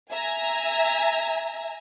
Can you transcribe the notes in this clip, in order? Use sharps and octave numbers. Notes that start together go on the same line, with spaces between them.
E5 G#5 A#5